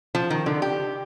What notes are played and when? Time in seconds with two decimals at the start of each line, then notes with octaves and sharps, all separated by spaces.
0.15 F3
0.30 D#3
0.46 D3
0.62 G4